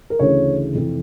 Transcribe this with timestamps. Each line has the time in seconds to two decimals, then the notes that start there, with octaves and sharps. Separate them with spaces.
0.10 A#4
0.19 D2 C#3 E3 C#5
0.74 F1 F2 E3